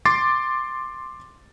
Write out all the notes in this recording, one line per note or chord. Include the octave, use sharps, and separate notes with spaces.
C6 D6 A6 C7